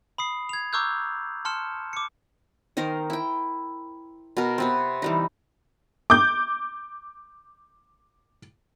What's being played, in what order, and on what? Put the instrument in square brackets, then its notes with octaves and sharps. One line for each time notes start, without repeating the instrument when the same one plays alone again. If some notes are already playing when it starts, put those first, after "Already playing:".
[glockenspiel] B5 D#6 C7
G#6 F7
A#5 C#6 D6 E6 F#6 G6
A5 C6 F6 C#7 E7
D6 C#7
[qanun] D#3 D#4 A#4 C5
E4 G5
B2 A#4
C3 B3 C4
E3 G3 D#4
[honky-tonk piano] D6 G6